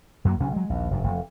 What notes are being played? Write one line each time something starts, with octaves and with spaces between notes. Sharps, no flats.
F#2 F#3 A3 A#3
B1 C#3 C#4
F#3 G#3
A#1 D#2
F1 G2
F1